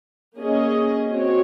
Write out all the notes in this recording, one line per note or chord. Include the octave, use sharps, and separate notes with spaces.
A#3 C#4 G#4 D#5
C4 F#4 C#5